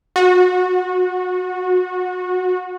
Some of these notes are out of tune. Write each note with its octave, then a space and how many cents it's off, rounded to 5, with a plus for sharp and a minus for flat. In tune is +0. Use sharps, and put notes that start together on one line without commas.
F#4 -25